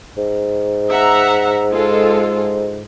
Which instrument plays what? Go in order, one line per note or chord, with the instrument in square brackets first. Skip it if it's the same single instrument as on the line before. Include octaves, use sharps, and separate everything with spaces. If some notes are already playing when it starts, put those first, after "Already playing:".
[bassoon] G#2
[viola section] E5 F#5 A#5
G#3 F4 A4